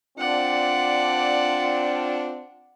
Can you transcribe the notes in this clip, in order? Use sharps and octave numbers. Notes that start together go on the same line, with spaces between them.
C4 D4 F4 D5 F#5